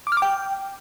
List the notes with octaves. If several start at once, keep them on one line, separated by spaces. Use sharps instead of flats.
D6
F6
D6
G5